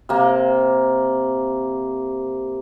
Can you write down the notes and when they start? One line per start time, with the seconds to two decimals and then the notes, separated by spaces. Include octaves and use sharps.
0.09 C3 A#3